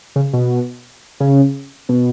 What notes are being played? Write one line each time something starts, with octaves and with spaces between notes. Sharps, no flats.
C#3
B2
C#3
B2